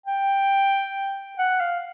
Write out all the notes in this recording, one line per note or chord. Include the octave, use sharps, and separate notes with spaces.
G5
F#5
F5